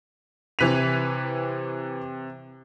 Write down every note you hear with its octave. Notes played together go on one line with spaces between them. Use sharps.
C3 E3 B4 B6 D#7 F7